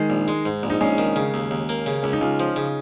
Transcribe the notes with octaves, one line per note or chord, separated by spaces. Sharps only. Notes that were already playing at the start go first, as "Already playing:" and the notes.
Already playing: D#3 G#3
A#1
G#3
G#2
A#1
D#4
A#1 G#3 C#4
D#3
C#3
D#2
D#2
A#3
C#3
C#2 C#4
D#4
C#2 C#4 F4
F3
C#3